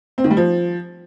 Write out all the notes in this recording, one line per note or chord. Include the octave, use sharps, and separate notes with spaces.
C4
D#3
G3
F3